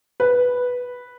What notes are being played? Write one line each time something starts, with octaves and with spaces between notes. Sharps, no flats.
B4